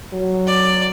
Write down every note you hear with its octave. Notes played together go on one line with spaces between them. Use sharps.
F#3
D5